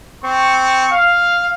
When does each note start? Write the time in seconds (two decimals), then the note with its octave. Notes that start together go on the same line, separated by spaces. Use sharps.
0.25 C4 C#6
0.91 F5